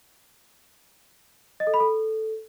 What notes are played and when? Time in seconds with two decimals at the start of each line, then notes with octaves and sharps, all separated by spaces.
1.60 D#5
1.67 A4
1.74 B5
1.80 A4